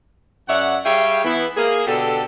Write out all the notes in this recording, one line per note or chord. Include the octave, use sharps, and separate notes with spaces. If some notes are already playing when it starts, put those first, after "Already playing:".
F#2 C#5 D5 E5 F#5
G3 G#4 C#5 E5 F5 G5
E3 B3 E4
A#3 G#4
B2 D3 G4 A4